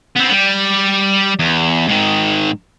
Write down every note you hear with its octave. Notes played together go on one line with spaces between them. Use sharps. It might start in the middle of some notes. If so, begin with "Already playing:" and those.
B3 C4
G3
E2
G#2 D#3